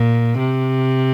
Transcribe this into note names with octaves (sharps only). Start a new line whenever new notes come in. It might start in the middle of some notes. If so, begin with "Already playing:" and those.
Already playing: A#2
C3